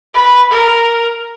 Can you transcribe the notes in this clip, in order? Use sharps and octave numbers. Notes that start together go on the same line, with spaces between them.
B4
A#4